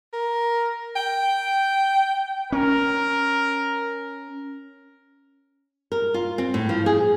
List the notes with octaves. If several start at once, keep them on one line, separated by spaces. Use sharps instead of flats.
A#4
G5
C#4 A#4
A#4
F4
C4
A2
F3
G#4